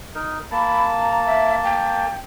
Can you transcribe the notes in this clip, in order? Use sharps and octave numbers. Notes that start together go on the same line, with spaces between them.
D#4 A#4
A#3 A5 B5
A#5
E5
G5